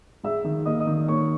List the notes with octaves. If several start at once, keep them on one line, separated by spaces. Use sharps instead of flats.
G#3 E5 E6
D#3
A#3 D#5 D#6
D#5 D#6
D#3
A#3 C#5 C#6